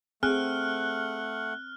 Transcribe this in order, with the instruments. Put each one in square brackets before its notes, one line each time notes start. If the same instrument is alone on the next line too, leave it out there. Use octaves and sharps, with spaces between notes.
[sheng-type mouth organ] A3 F#5 [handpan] C4 [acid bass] G#4 [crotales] F6 F#6